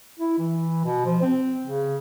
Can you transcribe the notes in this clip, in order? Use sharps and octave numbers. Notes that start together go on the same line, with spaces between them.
E4
E3
B2
F3
C4
C#3